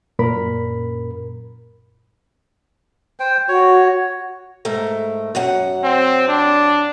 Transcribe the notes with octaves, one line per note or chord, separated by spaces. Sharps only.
F#2 A#2 A#4 B5
C5 G5
F#4 C#5
G#2 A3 A#4
F#2 F#3 F#5
C4
D4